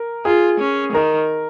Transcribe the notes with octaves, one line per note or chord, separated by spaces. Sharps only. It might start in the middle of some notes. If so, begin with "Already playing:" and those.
Already playing: A#4
F4 G#4
C#4
D#3 A#4